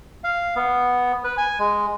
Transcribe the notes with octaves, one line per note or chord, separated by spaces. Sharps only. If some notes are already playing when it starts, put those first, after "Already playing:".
F5
B3
B4
G#5
G#3